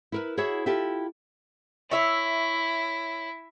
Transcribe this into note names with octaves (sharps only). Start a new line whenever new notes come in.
E4 A#4 B4
E4 F#4 G#4 C#5 E5
E4 F4 G4 A4 E5
E4 C#5 E5